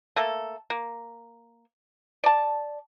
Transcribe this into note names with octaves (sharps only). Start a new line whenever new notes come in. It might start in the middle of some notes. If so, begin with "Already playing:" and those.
A3 A#3 A4
A#3
D5 A5